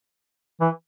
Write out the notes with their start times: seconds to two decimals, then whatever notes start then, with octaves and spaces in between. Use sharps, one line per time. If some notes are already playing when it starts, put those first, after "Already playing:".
0.61 E3